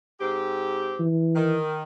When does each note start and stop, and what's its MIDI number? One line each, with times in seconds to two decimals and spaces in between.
0.20 1.02 44
0.20 1.02 60
0.20 1.02 67
1.00 1.57 52
1.35 1.83 51